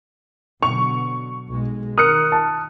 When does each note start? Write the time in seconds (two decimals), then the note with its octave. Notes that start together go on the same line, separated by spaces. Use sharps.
0.63 B2 D3 F#3 C#6 F7
1.49 B1 G#3
1.98 D#3 A#4 D#6 F6 F#6 C#7
2.32 A5